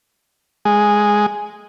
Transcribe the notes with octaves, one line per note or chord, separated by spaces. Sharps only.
G#3